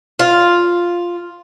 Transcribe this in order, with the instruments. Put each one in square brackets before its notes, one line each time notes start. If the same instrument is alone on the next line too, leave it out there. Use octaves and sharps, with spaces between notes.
[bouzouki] F4